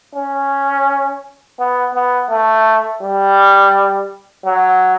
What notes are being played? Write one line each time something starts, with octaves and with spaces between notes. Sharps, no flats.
C#4
B3
B3
A3
G3
F#3